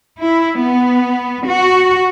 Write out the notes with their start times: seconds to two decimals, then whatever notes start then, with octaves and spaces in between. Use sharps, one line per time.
0.21 E4
0.59 B3
1.48 F#4